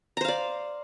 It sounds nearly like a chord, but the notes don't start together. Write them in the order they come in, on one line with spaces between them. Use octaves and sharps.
A#5 C5 F5 D5